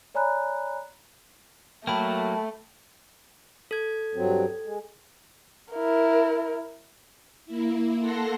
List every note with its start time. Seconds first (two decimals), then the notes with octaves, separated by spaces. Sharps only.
0.14 C#5 D5 G#5 A#5 B5 F#6
1.87 F#3 A3 A#3 G5 A5 B5
3.71 A4 G#6
4.15 G2 F#3 C4
4.65 G#3
5.73 E4 A#4
7.46 A#3 E4
7.99 A#3 A4 F#5 A5 C6 A#6